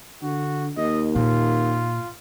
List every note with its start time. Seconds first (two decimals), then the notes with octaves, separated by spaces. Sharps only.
0.23 D3 F#4
0.77 D#2 D#5
1.15 A#2 F4